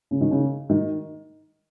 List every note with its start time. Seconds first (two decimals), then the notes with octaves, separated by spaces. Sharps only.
0.11 C#3
0.21 D#3
0.31 C#3
0.70 D#3